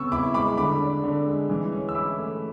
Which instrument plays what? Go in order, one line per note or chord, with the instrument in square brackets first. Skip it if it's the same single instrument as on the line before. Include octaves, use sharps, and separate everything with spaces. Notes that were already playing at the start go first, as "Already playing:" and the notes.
Already playing: [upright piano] C#3 B3 C#6 E6
E4 B5 D6
G#3 B5 D6
D3 B5 D6
D4
D3
G#3
E3
C#4
E6
E4 B5 D6
A3